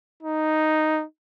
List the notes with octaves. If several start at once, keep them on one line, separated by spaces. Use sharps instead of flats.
D#4